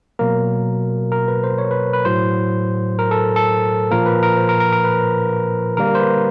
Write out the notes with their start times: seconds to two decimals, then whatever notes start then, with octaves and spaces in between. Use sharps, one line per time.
0.19 B2 F#3 A#3 A#4
1.12 A#4
1.28 B4
1.44 C5
1.58 C#5
1.71 B4
1.93 B4
2.05 A2 F#3 A3 C5
2.99 A#4
3.11 A4
3.36 A4
3.91 A#2 F3 A#3 A#4
4.06 B4
4.23 A#4
4.37 C5
4.49 A#4
4.60 A#4
4.72 A#4
4.84 B4
5.77 D3 G3 A#3 A#4
5.95 C5
6.00 B4